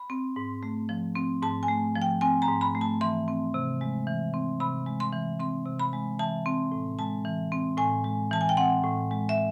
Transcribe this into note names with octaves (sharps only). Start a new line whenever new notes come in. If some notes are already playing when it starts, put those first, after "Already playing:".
Already playing: B5
C4
G#2
A3
F3
C4
G#2 A5
G#5
A3
F3
G5
C4 G#5
A#5
G#2
B5
A3
A5
E3 C6
C4
C3
G#3
E3
C4
C3 B5
G#3
C6
E3
C4 C6
C3
B5
G#3
E3 A5
C4
A2
G#3 A5
E3
C4
A2 G#5
G#3
E3 A5
G#5
G5
C4 F#5
A2
G#3
E5